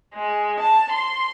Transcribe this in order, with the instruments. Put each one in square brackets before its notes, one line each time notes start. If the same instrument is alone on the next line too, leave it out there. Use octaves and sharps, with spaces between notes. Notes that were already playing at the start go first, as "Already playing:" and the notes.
[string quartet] G#3
A5
C6